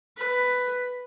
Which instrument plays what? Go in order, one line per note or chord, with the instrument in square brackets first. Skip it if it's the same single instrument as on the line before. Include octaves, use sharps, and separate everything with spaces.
[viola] B4